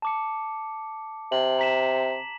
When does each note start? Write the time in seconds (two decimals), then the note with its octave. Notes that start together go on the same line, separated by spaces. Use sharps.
0.02 A5 D6 C#7
1.32 C3 F#7
1.59 A#5 B6 E7